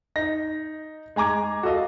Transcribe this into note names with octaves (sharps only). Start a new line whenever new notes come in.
D#4 A#6
G#3 G#5 A#5 D6 G#6
F#4 A4 D#5 F5